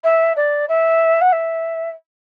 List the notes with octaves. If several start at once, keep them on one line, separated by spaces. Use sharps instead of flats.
E5
D5
E5
F#5
E5